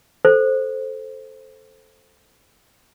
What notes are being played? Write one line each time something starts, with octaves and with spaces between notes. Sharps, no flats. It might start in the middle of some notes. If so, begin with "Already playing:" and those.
A4 C5